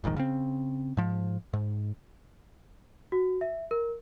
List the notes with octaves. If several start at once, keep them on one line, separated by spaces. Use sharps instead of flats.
F1 A#1 G#2 D#3
C#3 C4
G#2 F3
G#2
F#4
E5
A#4